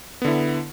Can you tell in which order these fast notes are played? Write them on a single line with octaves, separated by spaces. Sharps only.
B3 D3 E4